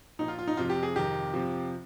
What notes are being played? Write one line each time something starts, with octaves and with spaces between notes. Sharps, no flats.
A#2 F3 D#4
F4
F4
D#4
F2 C3 F3 F4
G4
G#4
F2 C3 D#3 G4
F2 C3 F3